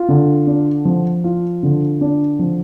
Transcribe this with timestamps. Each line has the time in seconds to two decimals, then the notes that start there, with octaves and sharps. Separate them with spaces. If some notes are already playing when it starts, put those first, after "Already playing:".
Already playing: F4
0.08 D3
0.47 D4
0.85 F3
1.24 F4
1.63 D3
2.01 D4
2.39 F3